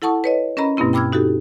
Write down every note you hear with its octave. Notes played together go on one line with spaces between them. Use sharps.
E4 A4 F#5 A5 C#6 D#6
B4 C#5 D#5
C#4 A#4 D#5 A#5 B5
G2 B2 A#3 C4 E4
G5 B5 D6 E6 F6 G#6
D#4 F#4 G4 A4